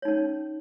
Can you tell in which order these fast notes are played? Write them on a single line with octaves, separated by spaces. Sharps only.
C#5 D#4 C#4